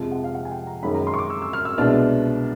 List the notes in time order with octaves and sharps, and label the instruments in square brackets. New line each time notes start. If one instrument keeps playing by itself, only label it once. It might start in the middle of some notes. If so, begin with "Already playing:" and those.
Already playing: [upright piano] F2 C3 F3 G#3
F#5
F5
F#5
G#5
G5
A#5
F#2 D#3 G#3 C#4 B5
A#5
C6
C#6
D6
E6
E6
F6
E6
C2 B2 G#3 B3 D4 F6